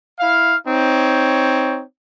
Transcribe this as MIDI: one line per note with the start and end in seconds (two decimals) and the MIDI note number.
0.20 0.56 64
0.20 0.56 77
0.67 1.82 60
0.67 1.82 63
0.67 1.82 73